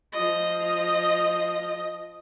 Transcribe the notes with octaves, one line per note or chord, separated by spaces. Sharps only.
F3 D#5